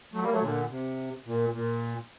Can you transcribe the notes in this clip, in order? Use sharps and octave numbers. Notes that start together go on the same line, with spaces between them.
F#3 A3
G3 A#3
F#3 A3
A#2 D3
C3
A#2
A#2